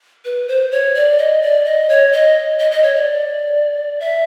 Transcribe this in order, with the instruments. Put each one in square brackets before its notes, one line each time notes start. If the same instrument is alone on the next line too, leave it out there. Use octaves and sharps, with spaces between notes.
[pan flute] B4
C5
C#5
D5
D#5
D5
D#5
C#5
D#5
D#5
D#5
C#5
D5
E5